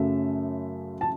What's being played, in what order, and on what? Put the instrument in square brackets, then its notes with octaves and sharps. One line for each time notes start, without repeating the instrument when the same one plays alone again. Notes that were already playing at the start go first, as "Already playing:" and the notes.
Already playing: [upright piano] F#2 C#3 F#3 A3 E5
A5